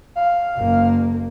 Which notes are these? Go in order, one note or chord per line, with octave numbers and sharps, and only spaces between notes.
F5
F#1 A#3